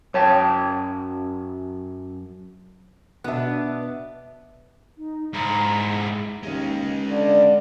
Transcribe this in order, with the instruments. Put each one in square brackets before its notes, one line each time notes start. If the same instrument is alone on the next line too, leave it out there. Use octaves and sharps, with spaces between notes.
[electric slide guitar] F#2 A5 [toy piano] C#5 F5 G5
[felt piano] B2 E5 [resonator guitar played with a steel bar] B3 D4
[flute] D#4
[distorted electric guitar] G#2 E4 [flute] A#5
[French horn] D#2 [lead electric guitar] G#3 C#4
[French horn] D3 [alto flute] D5